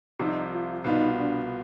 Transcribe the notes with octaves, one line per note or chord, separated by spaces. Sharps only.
C2 C3 F3 D#4
F4
C2 B2 B3 D#4 F4
D4